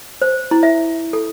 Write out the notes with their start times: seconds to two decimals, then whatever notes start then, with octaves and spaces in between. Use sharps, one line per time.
0.22 C5
0.51 E4
0.63 E5
1.13 A4